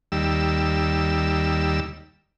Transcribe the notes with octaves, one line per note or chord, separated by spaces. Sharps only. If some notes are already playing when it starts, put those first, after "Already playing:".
D#2 G3 E6